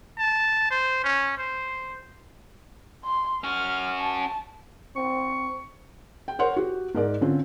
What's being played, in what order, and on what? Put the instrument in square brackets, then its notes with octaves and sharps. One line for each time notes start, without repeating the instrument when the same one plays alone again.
[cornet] A5
C5
C#4
C5
[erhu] C6
[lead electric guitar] C#4 F#4 [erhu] F6
[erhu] A5
[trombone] C4 [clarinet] C#6
[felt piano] G5
A#4 C5 C#5 F#5 C6
F#4 G4
G#2 A#4 D5
D3 C4 C#4 F4